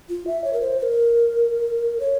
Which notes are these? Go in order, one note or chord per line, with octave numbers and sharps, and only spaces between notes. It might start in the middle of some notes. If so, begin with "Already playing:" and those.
F4
E5
C#5
A#4
C5
C5
A#4
C#5